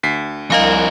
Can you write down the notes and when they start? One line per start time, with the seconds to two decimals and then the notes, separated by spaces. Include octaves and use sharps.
0.03 D2 B6 C7
0.50 C2 F2 A#4 D#5 F5 G#5